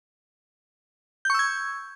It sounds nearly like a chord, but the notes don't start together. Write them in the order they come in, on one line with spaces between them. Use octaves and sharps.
G6 C#6 E6 G#6